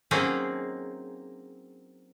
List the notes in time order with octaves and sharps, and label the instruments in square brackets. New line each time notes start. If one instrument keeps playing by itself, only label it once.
[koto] F#3 A#3 C4 C#4 D#4 G#4